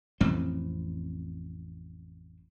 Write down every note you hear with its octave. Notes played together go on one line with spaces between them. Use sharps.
A1 F2 C4